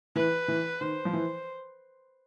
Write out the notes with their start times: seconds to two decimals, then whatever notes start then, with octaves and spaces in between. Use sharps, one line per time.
0.16 E3 B4
0.48 E3
0.81 D#3 C5
1.05 F3
1.13 E3